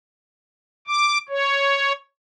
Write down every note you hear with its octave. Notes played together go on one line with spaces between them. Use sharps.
D6
C#5